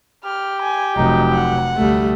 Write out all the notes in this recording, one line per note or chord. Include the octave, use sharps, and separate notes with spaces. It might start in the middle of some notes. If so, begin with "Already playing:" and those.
G4 F6
G#5
F1 F#3 D#4
F#5
D2 G3 A3